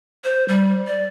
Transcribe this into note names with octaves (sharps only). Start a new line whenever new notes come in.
C5
G3
D5